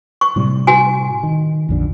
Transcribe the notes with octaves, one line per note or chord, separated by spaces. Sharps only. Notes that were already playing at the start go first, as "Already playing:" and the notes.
C#6
A2 C3 G3
F#4 G#5
D#3
A#1 F2 D3